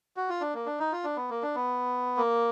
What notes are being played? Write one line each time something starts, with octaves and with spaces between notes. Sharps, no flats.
F#4
F4
D4
A#3
D4
D#4
F4
D4
B3
A#3
D4
B3
A#3